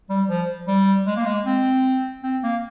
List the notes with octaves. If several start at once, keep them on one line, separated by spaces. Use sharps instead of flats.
G3
F3
G3
G#3
A#3
G#3
C4
C4
A#3